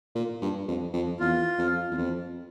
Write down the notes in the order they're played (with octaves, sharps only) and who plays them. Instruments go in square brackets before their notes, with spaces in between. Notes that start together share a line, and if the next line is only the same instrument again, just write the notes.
[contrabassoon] A#2
G2
F2
F2
[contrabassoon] E2 [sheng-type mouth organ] F4
[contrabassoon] F2
E2
F2